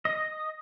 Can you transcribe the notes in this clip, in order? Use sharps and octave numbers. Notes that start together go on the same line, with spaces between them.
D#5